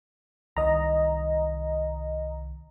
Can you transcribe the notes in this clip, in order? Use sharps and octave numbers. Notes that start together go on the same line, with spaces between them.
C2 D#3 D#5 A#5